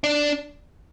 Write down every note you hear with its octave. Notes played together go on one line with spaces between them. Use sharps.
D4